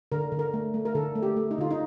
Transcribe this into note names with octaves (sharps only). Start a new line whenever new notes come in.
D3 A#4
D3
A#4
A3
A3
A#4
D3 A4
A3
G4
A3
D#4
D3 F4
D#4